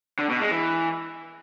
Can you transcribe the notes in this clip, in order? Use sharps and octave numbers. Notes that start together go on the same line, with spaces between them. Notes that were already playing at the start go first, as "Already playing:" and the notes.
D3
B2
G#3
E3